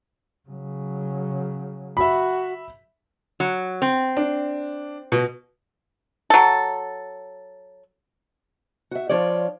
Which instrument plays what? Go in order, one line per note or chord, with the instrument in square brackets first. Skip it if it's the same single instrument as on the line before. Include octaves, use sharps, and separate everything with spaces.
[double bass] C#3 F#3
[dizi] F#4 [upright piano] E5 B5
[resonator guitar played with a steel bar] F#3
C4
[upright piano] D4
B2
[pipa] F#3 A4
[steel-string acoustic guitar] F#4 E5
F3 D4 F4 C#5 D5